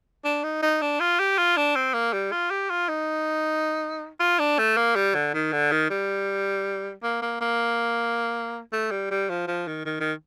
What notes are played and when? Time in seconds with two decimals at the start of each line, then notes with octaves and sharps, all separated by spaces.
0.24 D4
0.43 D#4
0.62 D#4
0.81 D4
1.00 F4
1.19 G4
1.38 F4
1.57 D4
1.75 C4
1.94 A#3
2.13 G3
2.32 F4
2.50 G4
2.70 F4
2.88 D#4
4.20 F4
4.39 D4
4.59 A3
4.77 A#3
4.95 G3
5.15 D3
5.34 D#3
5.53 D3
5.72 D#3
5.90 G3
7.03 A#3
7.22 A#3
7.40 A#3
8.73 A3
8.91 G3
9.11 G3
9.29 F3
9.47 F3
9.67 D#3
9.85 D#3
10.00 D#3